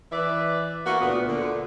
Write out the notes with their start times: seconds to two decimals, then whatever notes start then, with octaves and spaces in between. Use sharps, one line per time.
0.12 E3 B4 D5 E5
0.86 A#3 B3 E4 F#4
1.01 D2 A#2 B3
1.28 A#2 D3